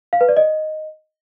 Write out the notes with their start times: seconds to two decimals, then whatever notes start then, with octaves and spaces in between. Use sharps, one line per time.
0.13 F5
0.21 B4
0.29 D5
0.37 D#5